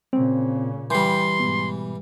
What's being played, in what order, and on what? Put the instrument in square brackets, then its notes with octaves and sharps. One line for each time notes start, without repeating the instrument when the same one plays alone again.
[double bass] A#2 C#3 [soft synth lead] C4
[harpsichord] E3 G3 [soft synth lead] G5 [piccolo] C6
[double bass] G#2 [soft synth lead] B2